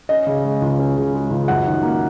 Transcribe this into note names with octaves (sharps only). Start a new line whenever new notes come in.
C#4 D#5
C#3
G#3
C#2
C#4
C#3
G#3
C#2
F#2 F#5
D#3
A#3